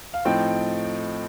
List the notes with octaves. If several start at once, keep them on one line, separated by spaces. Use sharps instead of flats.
F5
A2 F3 C4 D#4 G5